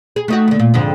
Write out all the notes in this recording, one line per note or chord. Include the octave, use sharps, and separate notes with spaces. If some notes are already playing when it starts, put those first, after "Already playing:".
G#4
A3 D#4 F#4
D#2 D3
A#2
F2 G#2 D3